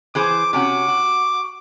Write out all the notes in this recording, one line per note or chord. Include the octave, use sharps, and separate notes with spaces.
E3 G#4 C5 D6
C3 C#4 F#4 D6
F#4